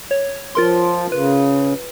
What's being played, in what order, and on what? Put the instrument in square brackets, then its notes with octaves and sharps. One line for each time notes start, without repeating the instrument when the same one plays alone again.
[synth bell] C#5
[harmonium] F3 [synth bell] F4 A#4 C6
[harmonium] C#3 [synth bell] B4